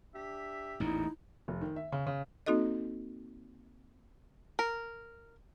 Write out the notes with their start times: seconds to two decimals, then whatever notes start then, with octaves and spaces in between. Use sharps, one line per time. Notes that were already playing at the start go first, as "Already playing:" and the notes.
0.15 D4 G4 E5
0.80 A1 E2 A#2 D#4 E4
1.48 F1
1.61 D#3
1.76 E5
1.92 C#3
2.06 C#3
2.46 A#3 C4 D#4 F#4 A4 D#5
4.59 A#4